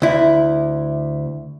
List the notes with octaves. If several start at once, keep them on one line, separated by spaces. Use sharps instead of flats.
D2 E4